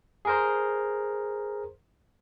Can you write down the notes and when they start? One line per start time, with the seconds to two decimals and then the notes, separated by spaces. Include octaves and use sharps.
0.25 G#4 A#4 C5